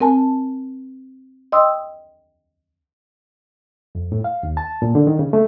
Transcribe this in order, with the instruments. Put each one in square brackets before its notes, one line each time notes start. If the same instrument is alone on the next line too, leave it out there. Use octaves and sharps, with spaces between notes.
[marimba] C4 A#4 G#5 A5
D#5 G5 C6 D#6 E6
[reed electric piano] F2
A2
F5
D#2
A5
A#2
D3
D#3
C#3
A3